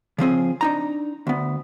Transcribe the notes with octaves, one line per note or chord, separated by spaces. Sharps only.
C#3 F3 C4 G#4
D4 D#4 A#5
D2 B3